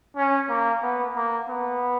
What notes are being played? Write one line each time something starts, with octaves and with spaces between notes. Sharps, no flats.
C#4
A#3
B3
A#3
B3